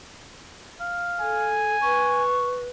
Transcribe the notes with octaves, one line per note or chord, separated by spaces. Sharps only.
F5
A4 G#5
B4 C#6